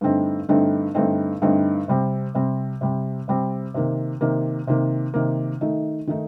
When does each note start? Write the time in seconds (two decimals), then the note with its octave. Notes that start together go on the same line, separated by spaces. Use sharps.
0.01 G2 D3 A3 C4 D#4
0.49 G2 D3 A3 C4 D#4
0.94 G2 D3 A3 C4 D#4
1.42 G2 D3 A3 C4 D#4
1.88 C3 G3 C4
2.35 C3 G3 C4
2.81 C3 G3 C4
3.28 C3 G3 C4
3.74 C3 D#3 A#3
4.21 C3 D#3 A#3
4.67 C3 D#3 A#3
5.14 C3 D#3 A#3
5.61 D#3 A3 D#4
6.07 D#3 A3 D#4